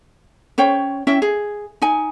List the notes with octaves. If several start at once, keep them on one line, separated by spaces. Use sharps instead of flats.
C#4 C5 C#5 G5
C#4 E4 E5 G5
G#4
D#4 G#5